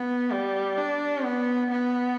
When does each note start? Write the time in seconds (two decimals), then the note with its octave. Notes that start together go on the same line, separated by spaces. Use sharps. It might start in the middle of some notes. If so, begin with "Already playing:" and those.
Already playing: B3
0.31 G3
0.78 D4
1.24 B3
1.71 B3